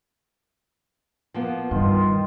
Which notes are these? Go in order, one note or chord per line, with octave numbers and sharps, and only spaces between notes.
F3 A#3 B3
G2 D#3 F4